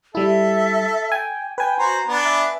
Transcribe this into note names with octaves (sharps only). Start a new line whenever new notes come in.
G3 E4 A4 E5
G5 G#5
B4 G5 G#5
F#4 C5 A#5
B3 D4
E5